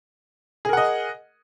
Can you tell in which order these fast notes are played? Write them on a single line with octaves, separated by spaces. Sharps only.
G#4 A#4 F#5 D#5